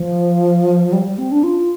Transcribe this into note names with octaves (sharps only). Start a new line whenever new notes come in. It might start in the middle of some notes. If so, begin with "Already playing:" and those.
Already playing: F3
G3
G3
C4
D4
F4